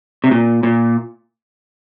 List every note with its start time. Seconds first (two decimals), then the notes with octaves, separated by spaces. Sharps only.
0.24 C3
0.31 A#2
0.63 A#2